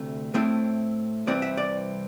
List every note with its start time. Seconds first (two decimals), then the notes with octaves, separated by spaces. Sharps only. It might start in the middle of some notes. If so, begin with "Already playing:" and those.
Already playing: D2 C3 A3
0.34 A2 A3 C4 E4
1.27 C2 C3 E3 C4 D5
1.42 E5
1.57 D5